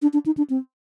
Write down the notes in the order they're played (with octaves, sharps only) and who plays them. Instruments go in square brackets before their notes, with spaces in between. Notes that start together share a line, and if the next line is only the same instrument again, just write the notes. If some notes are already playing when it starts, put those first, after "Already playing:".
[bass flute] D4
D4
D#4
D4
C4